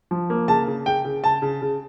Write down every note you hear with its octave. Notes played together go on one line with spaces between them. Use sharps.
F3
A#3
C#3 A5
C#3
C#3 G5
C#3
C#3 A5
C#3
C#3